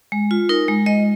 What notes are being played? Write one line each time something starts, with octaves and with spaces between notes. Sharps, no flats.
G#3
F4
D#4 A#4
G#3
G#3 D#5